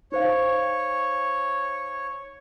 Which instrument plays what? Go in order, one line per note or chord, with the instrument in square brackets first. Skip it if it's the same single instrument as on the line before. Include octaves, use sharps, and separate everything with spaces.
[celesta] D#4 C5 F5 [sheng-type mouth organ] C#5